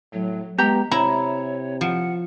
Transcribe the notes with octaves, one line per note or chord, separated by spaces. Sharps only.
A2 F#3
G#3 B3 G4 A#5
C3 E4 C#5 A#5
F3 F#5